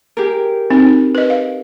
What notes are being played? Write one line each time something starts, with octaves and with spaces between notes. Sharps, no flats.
G4 G#4 A#4
C4 D#4
B4 D#5
F5